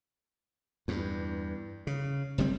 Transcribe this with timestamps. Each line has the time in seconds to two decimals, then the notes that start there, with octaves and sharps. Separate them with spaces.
0.88 E2 G2
1.87 C#3
2.38 F#1 C3 G3 C4